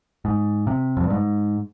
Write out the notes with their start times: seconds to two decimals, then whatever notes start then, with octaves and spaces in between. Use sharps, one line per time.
0.25 G#2
0.67 C3
0.97 F2
1.04 G2
1.10 G#2